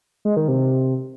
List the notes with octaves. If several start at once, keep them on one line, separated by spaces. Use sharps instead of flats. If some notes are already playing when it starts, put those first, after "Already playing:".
G#3
D#3
C3